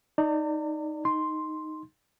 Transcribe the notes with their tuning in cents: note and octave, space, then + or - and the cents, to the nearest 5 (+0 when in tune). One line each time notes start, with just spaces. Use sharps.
D#4 +0 D5 +0 A#5 -45
D#4 +0 C6 +0